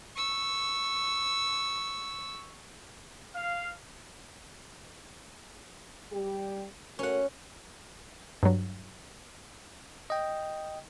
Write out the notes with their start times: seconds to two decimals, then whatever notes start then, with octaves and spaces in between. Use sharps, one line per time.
0.16 C#6 E6
3.36 F5
6.12 G3 G4
6.99 A3 C#4 F#4 A#4 F#5
8.43 G2 F#3
10.10 D#5 G5